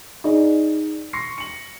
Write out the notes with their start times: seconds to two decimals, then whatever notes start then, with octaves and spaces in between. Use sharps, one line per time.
0.24 D#4 G#4 D5
1.13 C6 C#6 A#6 C7 C#7
1.38 C#7 F#7